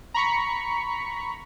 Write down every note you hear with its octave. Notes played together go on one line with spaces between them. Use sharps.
A#5 B5 C#6 B6 C#7